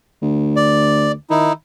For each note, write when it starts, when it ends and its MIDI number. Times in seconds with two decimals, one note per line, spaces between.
0.22 1.14 38
0.56 1.12 74
1.30 1.50 51
1.30 1.53 63
1.30 1.53 64